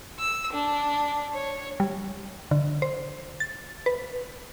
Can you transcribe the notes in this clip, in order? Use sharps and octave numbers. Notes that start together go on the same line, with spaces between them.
E6
D4
C#5
G3
D3
C5
A6
B4